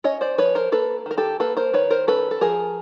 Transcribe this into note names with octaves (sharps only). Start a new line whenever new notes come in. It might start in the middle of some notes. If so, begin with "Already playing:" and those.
C#4 C#5 D#5
C5 D5
F3 B4 C#5
A#4 C5
A#3 A4 B4
D#3 A#4
G4 A4
A#3 A4 B4
A#4 C5
D#3 B4 C#5
A#4 C5
C#4 A4 B4
A4
F3 G#4 A#4